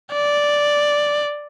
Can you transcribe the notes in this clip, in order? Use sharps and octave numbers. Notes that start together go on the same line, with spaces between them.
D5